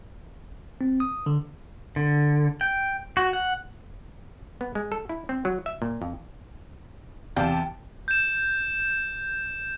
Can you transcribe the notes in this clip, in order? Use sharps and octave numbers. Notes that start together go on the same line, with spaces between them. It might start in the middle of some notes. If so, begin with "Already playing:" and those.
C4
D#6
D3
D3
G5
F#4
F#5
B3
G#3
A4
E4
C4
F#3
E5
A#2
F2
E2 C3 D5 F5 G5 A5
G6 E7